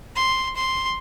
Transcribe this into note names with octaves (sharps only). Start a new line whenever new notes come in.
C6
C6